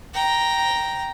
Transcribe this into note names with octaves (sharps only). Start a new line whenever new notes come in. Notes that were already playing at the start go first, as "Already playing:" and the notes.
G5 A#5